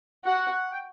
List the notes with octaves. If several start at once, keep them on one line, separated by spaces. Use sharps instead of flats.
F#4 F#5
F#5
G5